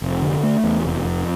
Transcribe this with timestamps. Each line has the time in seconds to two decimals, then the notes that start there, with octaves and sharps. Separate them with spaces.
0.02 F1
0.22 D3
0.43 A3
0.64 E2
0.85 F1
1.05 F2